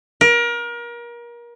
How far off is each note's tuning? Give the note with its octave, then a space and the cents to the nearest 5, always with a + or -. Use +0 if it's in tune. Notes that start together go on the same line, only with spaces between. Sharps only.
A#4 +30